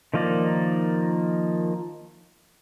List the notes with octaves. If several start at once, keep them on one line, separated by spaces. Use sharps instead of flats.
D#3 F3 A#3 D#4 D5